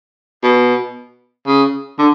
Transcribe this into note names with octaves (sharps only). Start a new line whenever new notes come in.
B2
C#3
D3